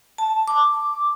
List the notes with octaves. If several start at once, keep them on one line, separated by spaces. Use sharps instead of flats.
A5
D6